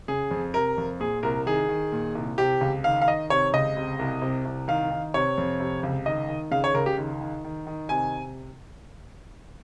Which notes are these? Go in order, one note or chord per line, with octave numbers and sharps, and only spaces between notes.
C#3 G#4
F2
C3 A#4
F2
A#2 G#4
C2 A#4
D#3 G#4
D#3
A#2
C2
C3 G4
C#2
D#3 F5
F5
D#3 D#5
C3 C#5
C#2 D#5
C3
C2
C3
C2
D#3 F5
D#3
C3 C#5
F2
C3
C#2
D#3 D#5
D#3
C#3 F5
C#5
C#2 A#4
G4
D#3
D#3
D#3
D#3
C3 G#5